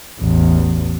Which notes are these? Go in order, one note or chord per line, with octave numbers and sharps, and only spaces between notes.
A1 E2